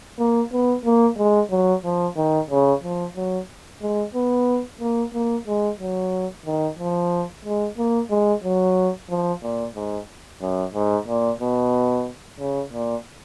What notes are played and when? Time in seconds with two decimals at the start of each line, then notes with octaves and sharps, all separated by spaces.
0.19 A#3
0.52 B3
0.85 A#3
1.18 G#3
1.51 F#3
1.84 F3
2.17 D#3
2.50 C#3
2.83 F3
3.16 F#3
3.82 G#3
4.15 B3
4.81 A#3
5.14 A#3
5.47 G#3
5.80 F#3
6.46 D#3
6.79 F3
7.45 G#3
7.78 A#3
8.11 G#3
8.44 F#3
9.10 F3
9.43 A#2
9.75 G#2
10.42 F#2
10.74 G#2
11.08 A#2
11.40 B2
12.40 C#3
12.73 A#2